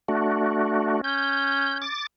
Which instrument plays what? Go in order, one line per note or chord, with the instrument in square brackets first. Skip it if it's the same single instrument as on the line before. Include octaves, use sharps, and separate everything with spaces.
[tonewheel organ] A3 D4 F#4
[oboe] C#4 [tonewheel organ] G6
[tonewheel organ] D6 A6